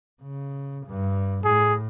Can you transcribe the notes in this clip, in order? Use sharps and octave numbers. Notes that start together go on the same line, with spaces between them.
C#3
G2
A2 G#4